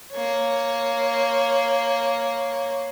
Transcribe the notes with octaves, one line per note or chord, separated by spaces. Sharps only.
A#3 C#5